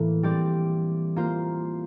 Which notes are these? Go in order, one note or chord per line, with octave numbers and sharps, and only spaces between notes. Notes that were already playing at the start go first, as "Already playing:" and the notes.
Already playing: A2 E3 A#3
G3 C4 G4 D5
A#3 F4 C5